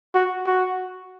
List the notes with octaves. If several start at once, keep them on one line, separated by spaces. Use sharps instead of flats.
F#4
F#4